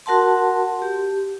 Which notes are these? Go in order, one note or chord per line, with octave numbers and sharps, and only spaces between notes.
F#4 A#4 F#5 A5 C6
G4